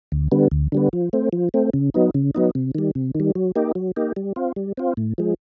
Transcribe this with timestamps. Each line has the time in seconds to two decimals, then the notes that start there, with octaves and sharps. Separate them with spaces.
0.12 D2
0.32 D3 G3 B3
0.52 D2
0.72 D3 G3 B3
0.93 F3
1.13 A3 C4
1.33 F3
1.54 A3 C4
1.74 C#3
1.94 F#3 B3 D#4
2.14 C#3
2.35 F#3 B3 D#4
2.55 C3
2.75 D#3 G3
2.95 C3
3.15 D#3
3.20 G3
3.35 F#3
3.56 A#3 D#4 G4
3.75 F#3
3.96 A#3 D#4 G4
4.16 G3
4.36 C4 F4
4.56 G3
4.77 C4 F4
4.97 A2
5.18 F3 G#3